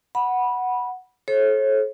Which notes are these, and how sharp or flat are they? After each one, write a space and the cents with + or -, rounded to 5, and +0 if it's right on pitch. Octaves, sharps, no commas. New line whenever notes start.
F#5 +0 B5 -15
A4 -35 C#5 -45